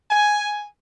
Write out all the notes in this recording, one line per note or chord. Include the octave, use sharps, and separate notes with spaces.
G#5